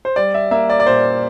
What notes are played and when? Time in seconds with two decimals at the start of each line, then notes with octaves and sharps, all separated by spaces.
0.05 C5
0.16 G3 D5
0.34 E5
0.51 A#3 E5
0.70 D5
0.80 D5
0.86 A#2 C5